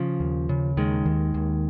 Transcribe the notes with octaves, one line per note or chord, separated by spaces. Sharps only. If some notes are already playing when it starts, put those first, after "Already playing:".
Already playing: C#3 F3
D#2
C#3
D#2 D#3 G#3
D#2
D#2